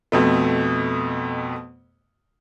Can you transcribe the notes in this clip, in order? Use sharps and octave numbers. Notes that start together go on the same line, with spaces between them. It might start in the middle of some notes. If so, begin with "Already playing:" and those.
F2 B2 A3